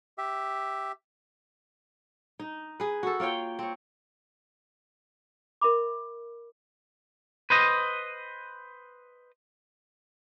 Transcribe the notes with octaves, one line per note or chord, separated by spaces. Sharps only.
G4 E5
D#4
G#4 B4
F#4 A4
A#3 F4 C#5 G5
C4 C#5
A#4 E5 B5 D6
B4 C5 D#5